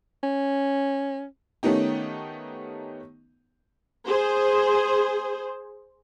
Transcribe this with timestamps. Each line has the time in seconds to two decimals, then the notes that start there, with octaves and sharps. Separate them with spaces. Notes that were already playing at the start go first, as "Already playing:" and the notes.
0.23 C#4
1.63 D#3 A3 B3 C#4 D#4 G4
4.08 G#4 C5